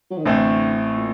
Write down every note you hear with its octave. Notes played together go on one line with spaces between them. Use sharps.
F#3
D#3
A1 A2 D3 A3 C4
A#2